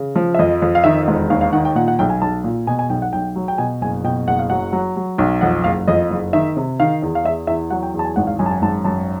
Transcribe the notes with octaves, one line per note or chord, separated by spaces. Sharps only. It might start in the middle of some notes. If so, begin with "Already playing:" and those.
Already playing: C#3
F3
E5
F2 D#5
F2
F5
D#3 E5
E1
D#2 F5
F5
D#3 F#5
G5
A#2 F#5
F#5
B1 G5
G#5
B1 A5
A#2
B2 G#5
G#5
B1 G5
F#5
B1 G5
F#3
G5
B2 G#5
F#1 G#5
B2 G5
F#1 F#5
F5
F#3 F#5
F#3
F#3
B1
F2 F#5
F#1 F5
F2 D#5
F#1
D#3 E5
C3
D#3 F5
E2
F5
E2 E5
E2 E5
F#3 F#5
G5
E2
A5
G#5
G#1 F#5
F5
F#2 G#5
A5
G#5
G#1 A5
F#2 A5